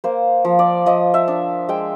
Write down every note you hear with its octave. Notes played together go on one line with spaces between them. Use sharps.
A#3 C5
F3
D5
F3 D#5
E5
D4
G#3 G5